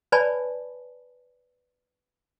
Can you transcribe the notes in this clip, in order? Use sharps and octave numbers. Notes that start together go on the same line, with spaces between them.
B4 C#5 D5 G#5 A5 B5